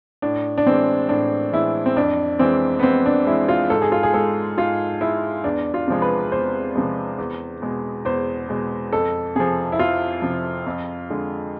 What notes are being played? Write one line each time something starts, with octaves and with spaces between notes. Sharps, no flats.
A2 D4
D4
E3 G#3 C4
A2 D4
E3 G#3 E4
C4
F2 D4
E3 G#3 C4
B3
F2 C4
D4
E3 G#3 E4
F4
G#2 A4
G#4
F4
G#4
G#3 A4
G#2 F4
G#3 E4
E2 D4
F4
C3 F3 G#3
B4
E2 C5
C3 F3 G#3
E2
B2 G#3
E2 C5
B2 G#3
F2 A4
C3 F3 G#4
E4
F2 F4
C3 F3
F2
D3 G#3